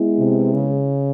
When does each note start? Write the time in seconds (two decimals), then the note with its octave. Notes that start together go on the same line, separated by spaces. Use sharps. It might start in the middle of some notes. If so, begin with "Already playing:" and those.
Already playing: G#3 B3 E4
0.19 C3
0.54 C#3